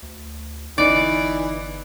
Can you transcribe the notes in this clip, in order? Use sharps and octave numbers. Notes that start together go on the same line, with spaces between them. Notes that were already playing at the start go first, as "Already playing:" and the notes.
D2
G1 E3 D#4 D5